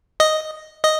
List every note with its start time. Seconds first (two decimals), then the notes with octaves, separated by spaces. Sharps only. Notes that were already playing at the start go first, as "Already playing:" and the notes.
0.20 D#5
0.83 D#5